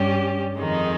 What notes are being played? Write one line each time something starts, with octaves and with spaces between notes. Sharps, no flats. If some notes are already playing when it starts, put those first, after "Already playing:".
Already playing: G2 G3 C#4 G4
F2 D#3 G#3 D#4